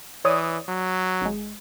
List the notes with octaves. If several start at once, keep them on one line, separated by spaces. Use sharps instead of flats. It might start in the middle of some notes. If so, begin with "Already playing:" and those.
E3 C#5 D5 D#6
F#3
G#1 G#3